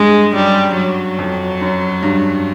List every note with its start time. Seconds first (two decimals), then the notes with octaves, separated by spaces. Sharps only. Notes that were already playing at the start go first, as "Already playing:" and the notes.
Already playing: G2 G#3
0.35 F#2 G3
0.77 F#3
1.19 F2
1.61 F#2
2.03 G2